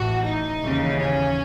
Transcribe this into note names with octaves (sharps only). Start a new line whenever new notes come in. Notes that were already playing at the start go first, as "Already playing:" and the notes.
Already playing: A1 A2 E3 F#4
D#4
D#2 C#3 E3
C#4